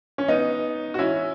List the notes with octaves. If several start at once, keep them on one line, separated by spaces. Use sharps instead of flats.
C#4
B3 D#4
F#4
C#4 E4